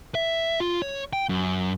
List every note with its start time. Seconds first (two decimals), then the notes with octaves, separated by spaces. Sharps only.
0.15 E5
0.60 F4
0.82 C#5
1.13 G5
1.29 F#2